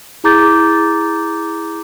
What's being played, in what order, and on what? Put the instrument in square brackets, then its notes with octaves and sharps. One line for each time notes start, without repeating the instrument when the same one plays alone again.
[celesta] E4 G#4 A#5 D6 G6 A6